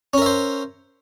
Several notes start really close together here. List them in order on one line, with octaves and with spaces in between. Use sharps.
C#4 A#4 E5 C5